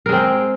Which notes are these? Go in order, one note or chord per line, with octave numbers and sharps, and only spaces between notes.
G#3 C4 A#4